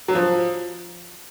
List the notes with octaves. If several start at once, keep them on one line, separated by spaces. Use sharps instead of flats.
F#3
F3